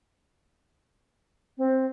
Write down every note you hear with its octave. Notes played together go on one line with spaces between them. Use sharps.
C4